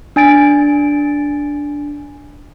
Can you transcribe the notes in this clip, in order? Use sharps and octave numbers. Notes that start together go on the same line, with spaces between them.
D4 G#5 A6 D7